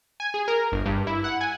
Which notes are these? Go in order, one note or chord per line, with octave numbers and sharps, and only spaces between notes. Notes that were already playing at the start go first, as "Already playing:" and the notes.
G#5
G#4
A#4
G1
G2
E4
F#5
G#5